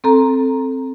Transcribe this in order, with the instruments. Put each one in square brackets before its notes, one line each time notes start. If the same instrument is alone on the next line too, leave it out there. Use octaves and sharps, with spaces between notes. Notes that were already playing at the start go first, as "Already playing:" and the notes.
[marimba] C4 A4 A#5